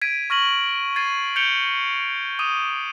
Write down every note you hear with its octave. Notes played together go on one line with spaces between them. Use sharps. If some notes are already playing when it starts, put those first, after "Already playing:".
G#6 B6 D7 D#7
C#6 F6 A#6 D#7 F#7
G#6 A6 C7 D#7
G6 C#7 D7 F7 G7
D6 D#6 D#7